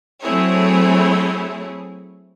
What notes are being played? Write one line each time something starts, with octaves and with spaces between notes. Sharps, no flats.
F#3 A3 C4 E4 G#4 C#5